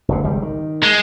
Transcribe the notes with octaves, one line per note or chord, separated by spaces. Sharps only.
F1 D2 C3
G#1 C#2 G3
D#3
G#3